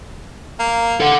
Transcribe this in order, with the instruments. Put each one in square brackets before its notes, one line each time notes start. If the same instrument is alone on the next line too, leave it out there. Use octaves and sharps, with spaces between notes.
[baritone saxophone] A#3
[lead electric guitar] A4 F#5